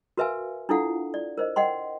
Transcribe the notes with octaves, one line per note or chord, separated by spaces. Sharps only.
F#4 A#4 B4 E5 F5 G#5
D4 E4 F4 A4 F5 F#5
D5
A#4 C5 D#5
D#5 F#5 G5 C6